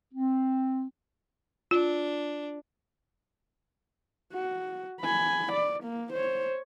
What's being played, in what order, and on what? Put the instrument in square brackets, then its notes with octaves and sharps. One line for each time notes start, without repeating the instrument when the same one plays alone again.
[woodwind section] C4
[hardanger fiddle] D4 [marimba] F4
[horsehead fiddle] F#4
G#5 B5
D5
A#3
C5 C#5